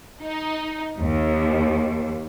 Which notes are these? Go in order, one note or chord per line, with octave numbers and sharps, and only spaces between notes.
D#4
D#2